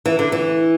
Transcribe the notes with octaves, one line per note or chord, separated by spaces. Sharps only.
E3
D3
E3